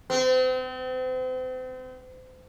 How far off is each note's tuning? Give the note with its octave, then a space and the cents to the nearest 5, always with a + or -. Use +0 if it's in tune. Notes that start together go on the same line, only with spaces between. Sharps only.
C4 -35